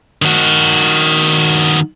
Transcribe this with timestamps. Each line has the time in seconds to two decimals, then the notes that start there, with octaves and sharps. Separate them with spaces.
0.22 D#3 F#4